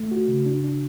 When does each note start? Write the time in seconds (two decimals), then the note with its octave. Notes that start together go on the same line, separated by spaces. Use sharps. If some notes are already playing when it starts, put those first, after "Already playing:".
Already playing: A3
0.11 F#4
0.28 C#3
0.46 D4
0.64 D4